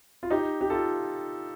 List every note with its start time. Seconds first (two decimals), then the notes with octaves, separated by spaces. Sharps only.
0.23 F4
0.31 D#4 G4
0.61 G4
0.70 F4 A4